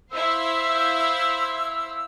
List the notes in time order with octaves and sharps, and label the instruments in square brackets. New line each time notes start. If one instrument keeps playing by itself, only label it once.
[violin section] E4 C5 F5 [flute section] E6